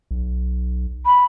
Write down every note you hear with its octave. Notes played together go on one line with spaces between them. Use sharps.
B1
B5